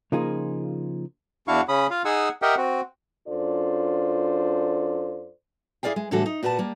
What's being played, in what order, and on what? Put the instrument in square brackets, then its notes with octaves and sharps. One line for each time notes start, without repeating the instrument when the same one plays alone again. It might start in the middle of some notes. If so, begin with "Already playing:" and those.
[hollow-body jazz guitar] C#3 F3 A#3 D#4 F4 G#4
[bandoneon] E2 D4 E4 F#4 F5 C#6
C#3 C#4 B5 D#6
F4 F5
D#4 G#4 F#5 G#5 E6
G4 A#4 D#5 E5 F#5 G5
C4 F#4
[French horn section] F#2 D4 F4 A4 C5 D5
[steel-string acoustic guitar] E4 G#4 D5 F5 G5
G#3
A2 D3 E3 G3 F#4 A4
D#4
A#2 F#4 B4 C#5 A5
G3 A#3